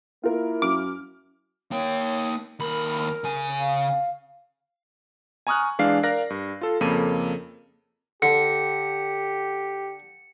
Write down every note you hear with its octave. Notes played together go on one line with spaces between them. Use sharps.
A#3 E4 F4 A#4
F#2 D6 F6
A#3 C#5 G5
D#2 A#4 B5
C#3 G#5
F5
G#5 A#5 C#6 D#6 F6 F#6
E3 G#3 D4 F5 C7
A#4 D5 F5 F#6 A#6
G2
F4 A4
F2 C#3 A#3 A4 D#7
D3 G4 C#7